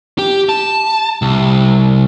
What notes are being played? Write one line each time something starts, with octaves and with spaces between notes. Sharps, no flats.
G4
A5
C2